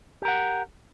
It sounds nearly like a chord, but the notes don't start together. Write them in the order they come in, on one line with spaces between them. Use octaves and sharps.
G4 A#4 F#5